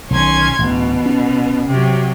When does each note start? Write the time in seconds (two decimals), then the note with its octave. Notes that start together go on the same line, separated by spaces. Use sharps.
0.10 B1 D#3 C#4 C6 G#6
0.59 A1 D2 B2
1.06 C#4
1.66 C3 F#3